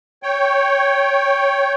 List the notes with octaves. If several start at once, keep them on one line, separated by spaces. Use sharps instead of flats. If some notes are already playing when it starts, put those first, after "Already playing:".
C#5 G5